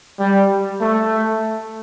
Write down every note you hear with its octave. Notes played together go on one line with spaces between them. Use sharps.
G3
A3